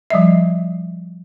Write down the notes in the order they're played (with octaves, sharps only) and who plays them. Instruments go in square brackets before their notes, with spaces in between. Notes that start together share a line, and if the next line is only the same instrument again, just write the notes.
[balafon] F3 G3 D#5 E5